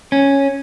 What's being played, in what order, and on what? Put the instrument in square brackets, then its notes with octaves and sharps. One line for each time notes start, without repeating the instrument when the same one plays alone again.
[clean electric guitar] C#4